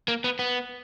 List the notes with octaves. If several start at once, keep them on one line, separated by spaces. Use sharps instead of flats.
A#3
B3
B3